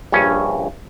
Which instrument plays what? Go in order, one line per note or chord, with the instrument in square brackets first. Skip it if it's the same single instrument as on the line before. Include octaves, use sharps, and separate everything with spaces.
[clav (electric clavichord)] A#1 G2 C#4